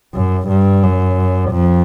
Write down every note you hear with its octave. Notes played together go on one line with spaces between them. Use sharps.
F#2
G2
F#2
F2